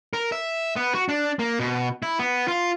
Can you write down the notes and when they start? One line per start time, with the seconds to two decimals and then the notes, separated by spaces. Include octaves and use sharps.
0.13 A#4
0.32 E5
0.76 B3
0.95 F#4
1.09 D4
1.39 A#3
1.60 B2
2.03 E4
2.19 B3
2.48 F4